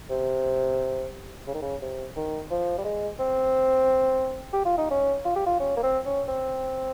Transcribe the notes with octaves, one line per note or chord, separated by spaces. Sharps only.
C3
C#3
D#3
C#3
C3
D#3
F3
G3
G#3
C4
G4
F4
D#4
C#4
F4
G4
F4
C#4
A#3
C4
C#4
C4